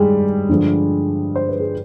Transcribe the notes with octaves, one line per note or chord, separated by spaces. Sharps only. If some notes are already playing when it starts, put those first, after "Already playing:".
Already playing: G2 D#3 G3 G#3 G4 G#4
G2 D3 F3 G#3
C5
B4
G#4